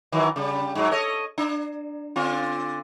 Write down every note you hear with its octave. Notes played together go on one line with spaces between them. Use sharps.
D#3 E3 F#3
C#3 G3
G#2 F#3
A4 C#5 D#5
D4
D3 C4 F4